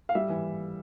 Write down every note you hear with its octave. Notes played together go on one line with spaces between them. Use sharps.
F5
G3 E5
E3